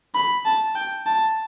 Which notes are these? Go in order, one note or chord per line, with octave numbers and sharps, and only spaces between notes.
B5
A5
G5
A5